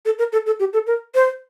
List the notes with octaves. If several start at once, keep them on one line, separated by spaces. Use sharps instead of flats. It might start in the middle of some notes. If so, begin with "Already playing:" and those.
A4
A#4
A4
A4
G4
A4
A#4
C5